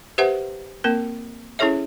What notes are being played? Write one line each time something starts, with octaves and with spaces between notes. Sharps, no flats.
G4 B4 C5 E5 F#5
A#3 C4 A#4
C#4 E4 G#4 A4 C#5 E5